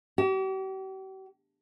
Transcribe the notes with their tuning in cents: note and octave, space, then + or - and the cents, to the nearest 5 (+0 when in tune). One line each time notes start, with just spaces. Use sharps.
G4 -45